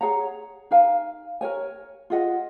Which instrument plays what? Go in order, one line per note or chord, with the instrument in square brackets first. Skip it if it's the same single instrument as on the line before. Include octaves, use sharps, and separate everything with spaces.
[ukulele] G#4 C#5 F#5 A#5
D#4 A#4 F5 G#5
A#4 C#5 G#5
F4 G#4 D#5 F#5